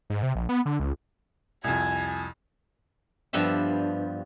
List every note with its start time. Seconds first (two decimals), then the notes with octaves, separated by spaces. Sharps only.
0.10 G#2
0.23 C3
0.35 A#1
0.49 B3
0.65 D3
0.80 C#2
1.64 C2 F2 G#5 G#6
3.33 G2 F3 B3 G4 E5